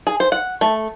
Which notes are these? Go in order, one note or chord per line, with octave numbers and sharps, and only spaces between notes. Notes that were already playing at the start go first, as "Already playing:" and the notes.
G#4
C5
F#5
A3